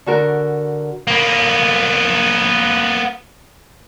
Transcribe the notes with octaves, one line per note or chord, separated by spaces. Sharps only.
D3 F#4 A#4
A#3 B3